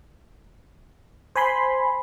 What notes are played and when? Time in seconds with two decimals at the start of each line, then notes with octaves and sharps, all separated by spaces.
1.36 C5 G#5 B5 C6